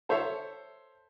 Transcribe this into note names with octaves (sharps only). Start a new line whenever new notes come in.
A4 C5 C#5 E5